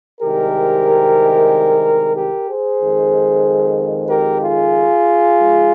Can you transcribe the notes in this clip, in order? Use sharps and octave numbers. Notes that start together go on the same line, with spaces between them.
C2 C3 D#3 G#3 G4 A#4
G4 A#4
G#4 C5
F2 D#3 G#3
G4 A#4
F4 G#4
G#2 F3 G#3